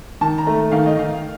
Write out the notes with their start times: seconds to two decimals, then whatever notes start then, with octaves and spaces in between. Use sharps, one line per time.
0.21 D#3 A5
0.38 A#5
0.47 A3
0.72 D#3 F5
0.86 D#5
0.97 D#3 F5